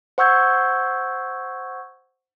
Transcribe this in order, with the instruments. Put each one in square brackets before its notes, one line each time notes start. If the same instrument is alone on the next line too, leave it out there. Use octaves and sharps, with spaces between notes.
[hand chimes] C5 F#5 C#6 E6 G6 G#6